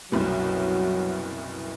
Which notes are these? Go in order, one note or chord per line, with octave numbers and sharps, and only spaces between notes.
F#1 C2 B2 F#3